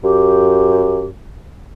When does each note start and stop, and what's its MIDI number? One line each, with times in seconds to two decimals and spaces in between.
0.04 1.14 42
0.04 1.07 67